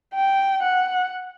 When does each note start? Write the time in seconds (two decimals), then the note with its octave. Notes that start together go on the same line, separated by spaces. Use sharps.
0.14 G5
0.63 F#5